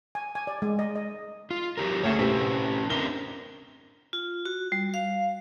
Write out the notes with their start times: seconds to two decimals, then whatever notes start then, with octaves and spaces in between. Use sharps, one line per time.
0.15 G#5
0.35 G#5
0.47 D5
0.62 G#3
0.79 D#5
0.96 D#5
1.51 F4
1.77 F#3 G4 A#4
2.04 D2 A3 G#4 C#5
2.19 C3 C4 C#4 E4 B4
2.90 C4 D4 A#4 G7
4.13 F4
4.45 F#4
4.72 G3
4.94 F5